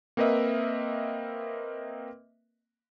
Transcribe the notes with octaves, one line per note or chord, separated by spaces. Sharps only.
A#3 C4 A#4 B4 D#5 E5